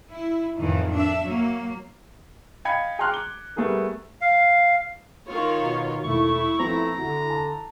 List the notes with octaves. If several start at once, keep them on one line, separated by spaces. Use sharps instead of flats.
E4
F2 A2 D#3 E3
D4 E5
F#3 A#3
D#5 F5 G5 B5 G#6 C#7
G#4 G5 A#5 C6 F6 F#6
D6 G7
G3 A3 B3 G#4 A#4
F5
D#3 F4 C#5
B2
E1 A3 E4 C#6
F3 A3 B3 C4 A#5
D3 F#4
A5